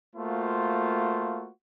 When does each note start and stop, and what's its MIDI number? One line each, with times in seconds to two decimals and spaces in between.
0.16 1.50 57
0.16 1.50 58
0.16 1.50 65
0.16 1.50 66
0.16 1.50 72